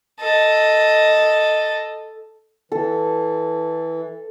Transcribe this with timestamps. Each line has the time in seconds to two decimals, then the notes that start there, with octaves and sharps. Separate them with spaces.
0.20 A4 D#5
2.72 E3 A4